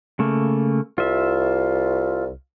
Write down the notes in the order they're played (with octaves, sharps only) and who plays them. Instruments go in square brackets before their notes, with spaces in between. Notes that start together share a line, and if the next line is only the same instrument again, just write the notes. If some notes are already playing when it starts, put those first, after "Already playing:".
[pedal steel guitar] C#3 A3 A#3
[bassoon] C2 [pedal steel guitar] F4 E5